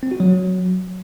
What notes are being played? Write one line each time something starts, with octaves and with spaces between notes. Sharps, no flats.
C4
F#4
F#3